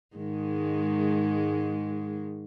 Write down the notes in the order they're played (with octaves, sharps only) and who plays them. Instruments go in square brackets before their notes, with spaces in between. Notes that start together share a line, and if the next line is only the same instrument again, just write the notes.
[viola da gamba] G#2 D#3 G#3